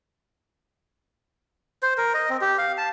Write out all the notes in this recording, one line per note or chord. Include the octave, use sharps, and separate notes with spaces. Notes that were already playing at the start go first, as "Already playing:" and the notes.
C5
A#4
D#5
C4
G4
F5
A5